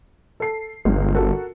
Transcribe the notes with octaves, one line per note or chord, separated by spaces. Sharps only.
A4 C7
G1 C#2 G2
F#4 A4 A#4